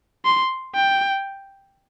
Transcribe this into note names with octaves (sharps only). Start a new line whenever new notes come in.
C6
G5